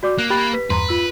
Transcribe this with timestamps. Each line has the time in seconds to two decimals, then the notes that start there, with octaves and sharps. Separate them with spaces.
0.03 F#4 D5 D6
0.18 A#3 F#6
0.30 G4 B5 F#6 A6
0.53 B4 B6
0.70 E2 G2 B4 A#5 C6
0.89 F4 E6